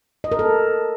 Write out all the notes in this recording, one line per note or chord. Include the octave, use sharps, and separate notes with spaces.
D#5
A#4
A4